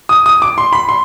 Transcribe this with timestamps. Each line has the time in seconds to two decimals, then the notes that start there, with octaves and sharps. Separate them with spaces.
0.09 D#6
0.26 D#6
0.42 D6
0.58 C6
0.73 B5
0.89 C6